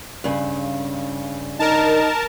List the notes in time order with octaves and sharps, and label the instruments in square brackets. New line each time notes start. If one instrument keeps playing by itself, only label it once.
[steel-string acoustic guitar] G2 C#3
[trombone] D#4 [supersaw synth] A#4 A5